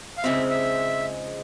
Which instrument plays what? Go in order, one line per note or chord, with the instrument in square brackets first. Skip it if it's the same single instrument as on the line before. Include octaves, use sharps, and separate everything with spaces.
[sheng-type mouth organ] F5
[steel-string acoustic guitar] C#3 F3 G#3 C4 D#4 [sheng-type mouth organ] E5
[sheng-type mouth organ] E5